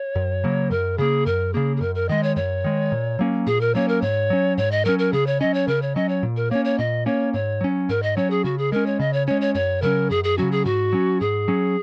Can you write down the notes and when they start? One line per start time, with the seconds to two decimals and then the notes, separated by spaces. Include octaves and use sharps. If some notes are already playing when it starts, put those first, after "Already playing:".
Already playing: C#5
0.15 F#2
0.44 C#3 F#3 A#3
0.71 F#2 A#4
0.98 C#3 A#3 G#4
1.26 F#2 A#4
1.53 C#3 A#3 G#4
1.77 G#4
1.81 F#2 A#4
1.95 A#4
2.09 D#3 G#3 D#5
2.23 C#5
2.36 F#2 C#5
2.64 D#3 G#3
2.92 A#2
3.19 F#3 A#3 C#4
3.47 A#2 G#4
3.61 A#4
3.75 F#3 A#3 C#4 C#5
3.88 A#4
4.02 G#2 C#5
4.30 F#3 C#4
4.58 G#2 C#5
4.71 D#5
4.85 F#3 C#4 A#4
4.99 A#4
5.13 C#3 G#4
5.27 C#5
5.40 F#3 C#4 D#5
5.54 C#5
5.67 C#3 A#4
5.82 C#5
5.95 F#3 C#4 D#5
6.09 C#5
6.23 A#2
6.37 A#4
6.51 A#3 C#4 C#5
6.65 C#5
6.78 A#2 D#5
7.06 A#3 C#4 C#5
7.34 G#2 C#5
7.61 F#3 C#4
7.89 G#2 A#4
8.03 D#5
8.17 F#3 C#4 C#5
8.30 G#4
8.44 C#3 F#4
8.58 G#4
8.72 G#3 C#4 A#4
8.86 C#5
8.99 C#3 D#5
9.13 C#5
9.27 G#3 C#4 C#5
9.41 C#5
9.55 F#2 C#5
9.82 C#3 F#3 C#4 A#4
10.10 F#2 G#4
10.24 G#4
10.38 C#3 F#3 C#4 F#4
10.51 G#4
10.65 G#2 F#4
10.93 F#3 C#4
11.21 G#2 G#4
11.48 F#3 C#4